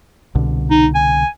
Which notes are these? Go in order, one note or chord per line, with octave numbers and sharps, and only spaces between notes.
C2 B2 D3
D#4
G#5